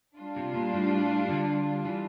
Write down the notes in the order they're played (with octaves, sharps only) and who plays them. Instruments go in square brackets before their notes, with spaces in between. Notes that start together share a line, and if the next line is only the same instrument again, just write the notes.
[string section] G3 D4 F4
[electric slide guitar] C3
A#2
A2
D3
E3